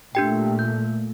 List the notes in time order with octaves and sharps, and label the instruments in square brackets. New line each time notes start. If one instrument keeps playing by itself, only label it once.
[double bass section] A#2 A3 [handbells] D4 G4 G5
[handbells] G6